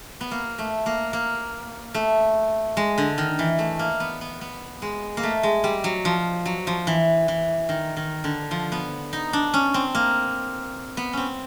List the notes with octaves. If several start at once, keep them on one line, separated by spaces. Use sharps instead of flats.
B3
A#3
A3
A#3
A#3
A3
G#3
D3
D#3
E3
A3
A#3
B3
B3
B3
G#3
A#3
A3
G#3
G3
F#3
F3
F#3
F3
E3
E3
D#3
D#3
D3
F3
B3
D#4
D4
C#4
C4
A#3
B3
C4 C#4